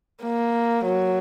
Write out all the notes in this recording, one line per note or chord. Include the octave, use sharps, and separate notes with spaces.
A#3
F#3